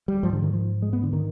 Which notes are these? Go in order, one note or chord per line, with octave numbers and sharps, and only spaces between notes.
G3
G#2 F3
D3
D#3
F3
G#3
B3
D3
D#3